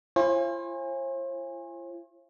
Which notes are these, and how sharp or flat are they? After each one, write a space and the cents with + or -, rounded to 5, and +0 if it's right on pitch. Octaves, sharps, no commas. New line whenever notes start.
F4 -45 C5 +45 G#5 -20